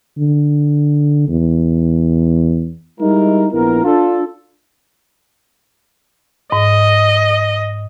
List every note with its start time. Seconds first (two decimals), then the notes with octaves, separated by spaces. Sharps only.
0.18 D3
1.28 E2
3.00 G3 G#3 D#4 E4 A#4
3.53 A#1 B3 E4 A#4
3.84 D4 F4 A4
6.52 G#2 D#5